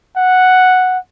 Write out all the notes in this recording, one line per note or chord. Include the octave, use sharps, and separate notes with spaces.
F#5